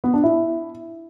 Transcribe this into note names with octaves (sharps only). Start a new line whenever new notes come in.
B3
D4
E4